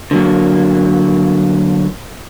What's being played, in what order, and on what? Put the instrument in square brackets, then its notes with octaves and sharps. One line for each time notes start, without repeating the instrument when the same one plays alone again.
[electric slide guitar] D3 F#3 A#3